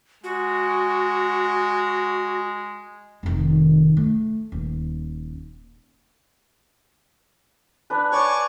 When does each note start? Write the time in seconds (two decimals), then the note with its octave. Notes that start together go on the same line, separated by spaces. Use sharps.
0.24 G#3 F#4
3.23 F1 D#3
3.97 A3
4.52 D#1
7.90 D4 B4
8.12 C#5 D5 G#5 C#6